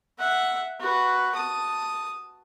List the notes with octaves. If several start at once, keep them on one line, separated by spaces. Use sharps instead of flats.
E5 F#5
F#4 B4
A5 D#6